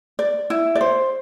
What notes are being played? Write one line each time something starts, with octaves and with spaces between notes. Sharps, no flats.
D5
E4
D5
C5